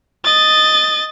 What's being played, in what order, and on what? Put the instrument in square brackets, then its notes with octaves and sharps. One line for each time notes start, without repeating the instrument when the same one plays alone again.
[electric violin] D#5 A6